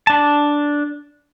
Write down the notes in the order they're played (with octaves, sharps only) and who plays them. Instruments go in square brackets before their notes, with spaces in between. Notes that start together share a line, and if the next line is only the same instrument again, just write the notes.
[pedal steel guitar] D4 A5